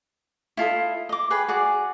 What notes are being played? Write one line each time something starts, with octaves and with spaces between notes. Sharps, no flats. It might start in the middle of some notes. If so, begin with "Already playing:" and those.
E4 F4 A4 D#5
D#5 D6
G#4 B4 G5
F#4 G#4 D5